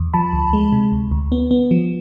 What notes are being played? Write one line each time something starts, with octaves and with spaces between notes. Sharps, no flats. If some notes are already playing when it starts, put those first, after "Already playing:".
Already playing: E2
F3 A5 B5
D2
G#3
C3
D2
D2
B3
B3
F3